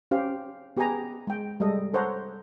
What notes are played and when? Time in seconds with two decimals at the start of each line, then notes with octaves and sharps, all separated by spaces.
0.11 C#4 G4 C5 F5
0.77 B3 G4 G#4 B4 G#5 A#5
1.27 G#3 G5
1.60 G3 G#3 A4 D#5
1.94 A4 C5 C#5 F#5 A#5